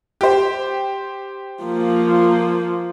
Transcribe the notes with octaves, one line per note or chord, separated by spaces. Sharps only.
G4 C5
F3 A#3